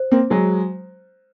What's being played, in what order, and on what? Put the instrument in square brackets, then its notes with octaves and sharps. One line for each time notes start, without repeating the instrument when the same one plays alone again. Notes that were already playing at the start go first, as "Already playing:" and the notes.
Already playing: [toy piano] C5
[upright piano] A#3 C4
F#3 G#3